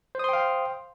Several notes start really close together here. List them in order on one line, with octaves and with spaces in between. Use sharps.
C5 D#6 C6 G5 F5